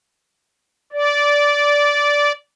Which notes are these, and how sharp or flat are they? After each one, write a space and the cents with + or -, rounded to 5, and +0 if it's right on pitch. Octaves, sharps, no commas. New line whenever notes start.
D5 -15